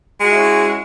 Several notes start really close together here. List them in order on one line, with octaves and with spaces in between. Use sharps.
G#3 F#4 E4 C#4